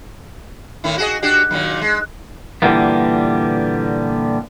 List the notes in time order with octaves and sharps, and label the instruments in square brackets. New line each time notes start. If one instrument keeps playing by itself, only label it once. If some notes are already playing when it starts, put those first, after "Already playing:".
[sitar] A2 D#3 E4
F#4 G#4 D#5
D4 F#4 G4
A#2 D#3 F#3
G#3
[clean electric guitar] A#2 D3 E3 G3 A#3 B3